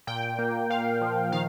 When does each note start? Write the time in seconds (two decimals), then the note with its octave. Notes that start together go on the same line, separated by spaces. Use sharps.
0.07 A#2 G5
0.39 A#3
0.70 A#2 F5
1.01 F3
1.32 D#3 F5